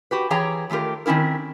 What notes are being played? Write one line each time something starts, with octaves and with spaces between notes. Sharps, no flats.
F#4 G4 B4
E3 G4 G#4 C#5 G5 A#5
D#3 A3 F4 G4 A#4
D#3 C4 C#4 E4 A#4